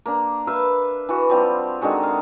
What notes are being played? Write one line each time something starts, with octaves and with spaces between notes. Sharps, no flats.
A#3 D4
B4 E5 F5
E3 F#4
F3 G3 C4
D3 D#3 G#3 F#4
F5